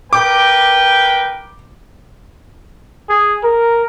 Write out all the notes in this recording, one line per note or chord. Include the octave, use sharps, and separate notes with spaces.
A#4 B4 G5 D6
G#4
A#4